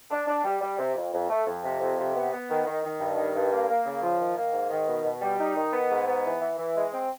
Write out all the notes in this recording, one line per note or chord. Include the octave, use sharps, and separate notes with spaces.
D4
D4
G3
G3
C3
F2
F2
A3
F2
C3
F2
C3
B3
B3
D#3
D#3
D#3
G2
D#3
G2
A#3
A#3
C#3
F3
D#3
A#3
G#2
D#3
B2
B2
G3
D#4
D#3
B3
G#2
B3
E3
E3
E3
G#3
C4